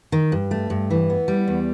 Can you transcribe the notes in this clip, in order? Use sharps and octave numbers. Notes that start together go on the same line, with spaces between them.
D#3
G2
A3
G2
E3
B3
G3
E2